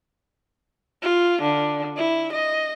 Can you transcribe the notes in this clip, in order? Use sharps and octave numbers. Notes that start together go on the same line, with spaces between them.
F4
D3
E4
D#5